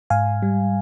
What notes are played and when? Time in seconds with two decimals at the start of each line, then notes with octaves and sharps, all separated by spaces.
0.10 G#2 F5 G#5
0.43 G3